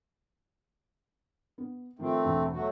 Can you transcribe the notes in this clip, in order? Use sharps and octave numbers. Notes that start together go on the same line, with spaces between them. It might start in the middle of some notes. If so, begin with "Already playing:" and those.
B3
D#3 F3 A3 C4
E1 E2 G2
F#3 A3 F#4